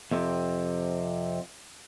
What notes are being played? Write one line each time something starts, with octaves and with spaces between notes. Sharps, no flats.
F2 C3 C4